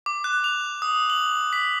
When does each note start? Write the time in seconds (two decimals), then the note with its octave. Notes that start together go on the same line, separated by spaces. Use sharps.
0.06 D6
0.24 F#6
0.44 F7
0.82 D#6
1.10 F#7
1.53 B6